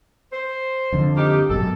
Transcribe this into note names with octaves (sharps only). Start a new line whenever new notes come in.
C5
F2 D3
A#3 D#4 G4
G#1 F#2 B2 A4